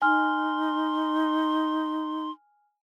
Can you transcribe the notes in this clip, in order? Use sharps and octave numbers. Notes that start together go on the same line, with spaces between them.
D#4 G#5 C6 F6